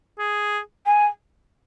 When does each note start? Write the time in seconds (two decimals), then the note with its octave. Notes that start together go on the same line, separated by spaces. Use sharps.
0.19 G#4
0.86 G#5